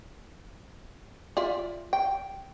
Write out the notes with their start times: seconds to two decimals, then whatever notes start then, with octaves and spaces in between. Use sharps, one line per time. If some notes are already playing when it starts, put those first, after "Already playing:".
1.37 F4 D5 E5
1.93 G5